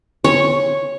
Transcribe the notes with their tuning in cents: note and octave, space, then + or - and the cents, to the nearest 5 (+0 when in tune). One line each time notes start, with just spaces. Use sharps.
C#5 -5